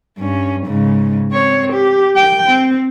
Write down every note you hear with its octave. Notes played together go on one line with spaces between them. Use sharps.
G2 C#4
G#2 C#3
C4 C#5
G4
G5
C4